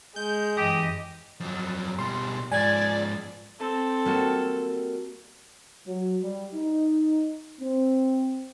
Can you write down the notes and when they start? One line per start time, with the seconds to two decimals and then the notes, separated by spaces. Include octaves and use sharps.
0.16 G#3 G6
0.57 F#2 E3 G4 D#5
1.40 F2 F#3
1.99 B2 G3 C6
2.52 G#2 F3 D5 G#5 G#6
3.59 C4 A4
4.05 G3 A#3 F#4
5.87 F#3
6.23 G3
6.54 D#4
7.61 C4